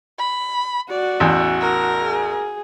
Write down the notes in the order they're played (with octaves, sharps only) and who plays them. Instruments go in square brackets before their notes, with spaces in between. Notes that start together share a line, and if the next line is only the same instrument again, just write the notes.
[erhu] B5
[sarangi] F#4 [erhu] D5
[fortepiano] A1 E2
[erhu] A#4
[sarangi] G#4